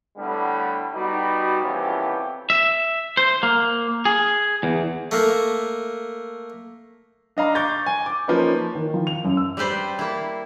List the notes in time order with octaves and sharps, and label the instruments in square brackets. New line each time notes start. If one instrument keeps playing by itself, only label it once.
[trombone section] A2 D3 G3 A3 B3
B2 G3 D#4 F#4
C2 F2 E3 B3 C#4 G4
[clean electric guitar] E5
C5
A#3
G#4
E2
[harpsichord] A3 A#3
[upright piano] D4 D#5 F5 A#5
C#6 D6 G6 A6
G#5
D6
F3 A#3 C#4 D#4 B4
[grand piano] D#3
F3
F7
F#2
E6
[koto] G3 G4 B4 C5 D5
A#3 E4